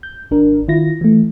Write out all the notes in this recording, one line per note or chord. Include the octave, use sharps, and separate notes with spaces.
G6
G#1 D4 A#4
D#3 E4 F4 A#6
E3 A3